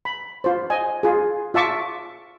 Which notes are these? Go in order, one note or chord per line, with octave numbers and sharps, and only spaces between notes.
B5
F4 C5
D#5 G#5
F4 G#4
F4 E5 A5 C#6 D6